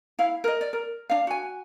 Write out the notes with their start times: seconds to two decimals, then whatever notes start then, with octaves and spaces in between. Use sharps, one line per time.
0.19 E4 F5
0.44 A#4 D#5
0.61 D5
0.73 A#4
1.10 D4 F5
1.27 F#4 G#5